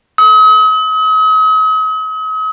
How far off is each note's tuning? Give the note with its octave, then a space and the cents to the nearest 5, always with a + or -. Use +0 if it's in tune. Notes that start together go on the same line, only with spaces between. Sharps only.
D#6 +45